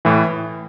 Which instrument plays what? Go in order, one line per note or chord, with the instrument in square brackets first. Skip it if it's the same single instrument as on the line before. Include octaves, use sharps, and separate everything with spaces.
[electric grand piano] A2 E3